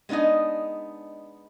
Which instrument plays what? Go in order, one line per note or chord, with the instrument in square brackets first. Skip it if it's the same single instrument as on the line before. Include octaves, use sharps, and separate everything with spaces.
[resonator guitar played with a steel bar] G#3 B3 D4 D#4 D#5